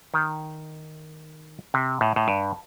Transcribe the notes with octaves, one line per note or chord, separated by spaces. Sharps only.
D#3
C3
A2
A2
G2